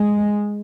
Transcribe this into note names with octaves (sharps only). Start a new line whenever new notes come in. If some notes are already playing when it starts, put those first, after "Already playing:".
Already playing: G#3